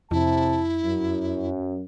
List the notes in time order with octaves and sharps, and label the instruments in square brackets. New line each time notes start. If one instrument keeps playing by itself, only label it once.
[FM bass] F2 [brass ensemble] C3 A5 [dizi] E4
[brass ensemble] F#2